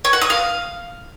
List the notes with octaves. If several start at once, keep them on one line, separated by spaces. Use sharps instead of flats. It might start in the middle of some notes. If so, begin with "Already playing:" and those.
C#5
F#5
D#6
F5